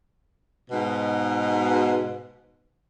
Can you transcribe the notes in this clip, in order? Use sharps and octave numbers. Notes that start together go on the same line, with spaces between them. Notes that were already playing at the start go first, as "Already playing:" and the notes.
G#2 B2